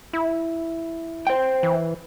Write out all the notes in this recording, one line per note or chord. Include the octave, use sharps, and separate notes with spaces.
E4
C5 G5
E3